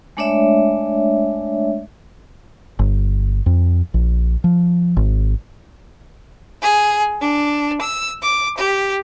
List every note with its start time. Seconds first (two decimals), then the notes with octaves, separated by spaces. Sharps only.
0.17 G#3 A3 D4 C#5 D5 E5
2.79 G1
3.46 F2
3.94 A#1
4.44 F3
4.97 G#1
6.61 G#4
7.19 D4
7.81 E6
8.23 D6
8.56 G4